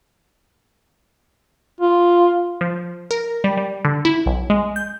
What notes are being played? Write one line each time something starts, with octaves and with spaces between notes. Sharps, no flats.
F4
F3
A#4
G3
G3
D3
E4
B1
G#3
G6